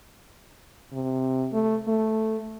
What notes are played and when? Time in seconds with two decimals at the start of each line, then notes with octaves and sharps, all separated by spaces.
0.93 C3
1.53 A3
1.87 A3